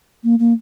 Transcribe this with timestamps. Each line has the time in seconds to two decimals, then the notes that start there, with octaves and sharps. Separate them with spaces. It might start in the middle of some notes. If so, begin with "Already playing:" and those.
0.24 A#3
0.39 A#3